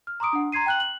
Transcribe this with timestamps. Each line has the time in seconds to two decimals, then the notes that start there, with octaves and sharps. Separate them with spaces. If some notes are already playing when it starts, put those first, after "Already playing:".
0.07 F6
0.20 A#5 C6 D6 D#6 D7
0.33 D4 F#5
0.52 A#5 C6 G#6 C7 D#7
0.66 G5 F#6 F#7
0.80 F#7